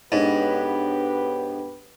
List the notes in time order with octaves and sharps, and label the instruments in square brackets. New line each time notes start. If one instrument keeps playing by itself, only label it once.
[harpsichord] G#2 [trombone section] B3 G4 B4 [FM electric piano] D4 A4 C#5